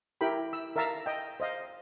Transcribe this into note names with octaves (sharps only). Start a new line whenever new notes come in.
E4 G4 A#4 G5 B5
E6
A#4 E5 F5 A5 A#5 E6
D#5 G5
C5 D#5 F5